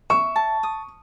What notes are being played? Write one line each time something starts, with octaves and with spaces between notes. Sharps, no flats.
E5 C#6
A5
D#6